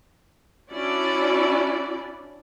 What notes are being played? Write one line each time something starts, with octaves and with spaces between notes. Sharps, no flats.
C#4 D4 E4 F#4 D5